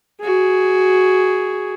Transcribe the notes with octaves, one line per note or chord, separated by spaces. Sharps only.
F#4 G#4